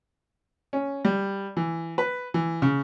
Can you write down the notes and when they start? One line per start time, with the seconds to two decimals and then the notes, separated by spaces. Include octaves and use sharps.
0.73 C#4
1.05 G3
1.57 E3
1.98 B4
2.34 E3
2.62 C#3